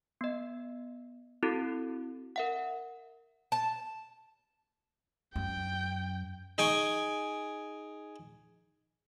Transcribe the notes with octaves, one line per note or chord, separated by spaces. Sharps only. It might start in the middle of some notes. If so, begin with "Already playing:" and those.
B3 D#5
C4 E4 F#4 A4
A#4 E5 F#5
A5
F#2 G5
D#4 G#4 G5 G#5 C#6